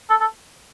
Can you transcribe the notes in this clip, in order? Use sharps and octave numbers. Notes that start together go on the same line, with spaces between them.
A4
A4